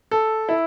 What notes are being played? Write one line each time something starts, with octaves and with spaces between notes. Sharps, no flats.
A4
E4